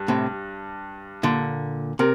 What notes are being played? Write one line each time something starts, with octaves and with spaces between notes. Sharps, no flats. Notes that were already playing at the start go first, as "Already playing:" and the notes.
Already playing: G2
A2 C3
A#2 D3
C3 A#4